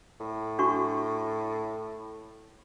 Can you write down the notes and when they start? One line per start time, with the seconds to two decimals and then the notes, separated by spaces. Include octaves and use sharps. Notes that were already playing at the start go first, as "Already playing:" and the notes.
0.20 A2
0.59 D4 F#4 C#6